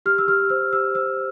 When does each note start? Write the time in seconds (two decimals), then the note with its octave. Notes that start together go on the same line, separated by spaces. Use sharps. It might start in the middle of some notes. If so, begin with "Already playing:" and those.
0.06 G4 F6
0.18 E6
0.28 G4 F6
0.50 C5 E6
0.72 G4 E6
0.95 C5 E6